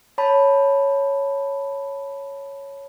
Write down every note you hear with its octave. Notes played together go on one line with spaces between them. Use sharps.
C#5 A5 B5